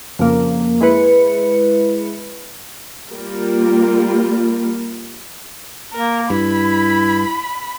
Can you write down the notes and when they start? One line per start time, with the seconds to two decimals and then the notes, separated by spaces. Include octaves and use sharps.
0.19 F2 C#3 A#3
0.81 G#3 E4 B4 C#7
3.12 G3 A#3 F4 A#4
5.94 A#3 A#4
6.30 G2 E4 B5